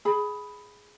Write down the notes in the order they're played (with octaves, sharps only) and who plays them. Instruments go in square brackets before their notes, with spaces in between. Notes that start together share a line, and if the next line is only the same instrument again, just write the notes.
[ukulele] G#4 B5